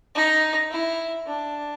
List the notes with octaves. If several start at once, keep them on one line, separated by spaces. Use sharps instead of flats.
D#4
E4
D4